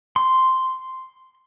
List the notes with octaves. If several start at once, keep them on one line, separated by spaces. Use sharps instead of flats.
C6